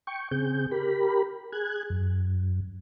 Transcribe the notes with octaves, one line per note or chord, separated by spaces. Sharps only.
G5 C#6
C#3 C4 G#4 G6
G4 A#4 B5
G#4 F#6 G#6
F#2